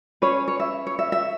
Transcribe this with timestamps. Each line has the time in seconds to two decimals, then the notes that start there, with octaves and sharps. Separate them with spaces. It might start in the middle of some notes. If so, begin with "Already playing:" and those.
0.22 C#4 G#4 B4 C#5
0.48 C#5
0.60 E5
0.87 C#5
0.99 E5
1.12 E5